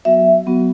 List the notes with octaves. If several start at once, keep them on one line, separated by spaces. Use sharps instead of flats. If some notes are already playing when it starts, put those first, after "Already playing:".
F#3 B3 F#4 E5
F#3 B3 F#4